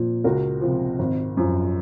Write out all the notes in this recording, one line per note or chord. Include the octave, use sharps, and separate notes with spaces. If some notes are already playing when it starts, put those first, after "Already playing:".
Already playing: A#2 F3 F4
C#2 F#4 A#4
C3 F3
G#1
F#2 F3